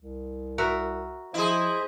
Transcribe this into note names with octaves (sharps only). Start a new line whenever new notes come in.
C2
F#4 A#4 E5
F3 E4 G#4 C5 D#5